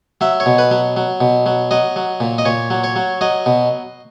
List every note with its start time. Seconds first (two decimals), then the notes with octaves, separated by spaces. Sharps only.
0.21 F#3 E5
0.40 C#5
0.46 B2
0.58 B4
0.71 F#3
0.97 F#3
1.21 B2
1.46 F#3
1.71 F#3 D#5
1.96 F#3
2.20 A#2
2.38 D#5
2.45 A#2 C#5
2.70 F#3
2.84 C#5
2.96 F#3
3.21 F#3 D#5
3.46 B2